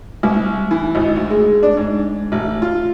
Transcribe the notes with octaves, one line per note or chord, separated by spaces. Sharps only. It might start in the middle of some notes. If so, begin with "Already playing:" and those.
C2
E3
G#1
D2
G#3
D4
G#2
A1
F4